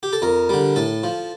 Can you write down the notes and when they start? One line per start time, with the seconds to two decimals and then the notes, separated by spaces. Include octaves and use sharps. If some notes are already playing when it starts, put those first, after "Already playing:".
0.03 G4
0.13 A4
0.22 F2 A#4
0.49 D3 G3
0.76 A2 A4
1.03 F3